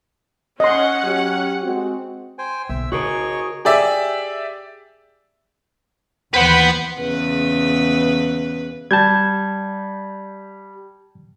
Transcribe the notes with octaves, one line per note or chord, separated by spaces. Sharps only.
C#4 D#5 F#5 C6
F#3 G4
G#3 C4 F#4
C5 G5 G#5
B1 E5 E6
C#3 F#4 G#4 A#4 C#5 D#5 C#6
G4 G#4 D5 E5
D#2 E3 B3 B4 C5 F#5 G5 B5
E2 C#3 B4
G3 A5 G6 G#6